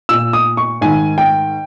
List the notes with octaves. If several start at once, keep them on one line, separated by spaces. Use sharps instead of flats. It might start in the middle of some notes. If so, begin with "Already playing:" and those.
A#2 E6
D#6
C#6
G#2 D#3 G#5
G5